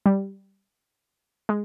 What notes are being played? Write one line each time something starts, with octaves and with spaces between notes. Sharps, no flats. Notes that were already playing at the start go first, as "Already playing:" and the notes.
G3
G#3